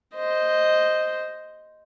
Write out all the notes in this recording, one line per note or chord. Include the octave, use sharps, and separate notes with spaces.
C5 D#5